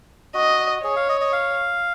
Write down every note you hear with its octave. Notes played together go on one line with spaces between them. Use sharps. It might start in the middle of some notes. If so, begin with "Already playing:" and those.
F#4 D#5
G#4 C#5
F5
D#5
D#5
F5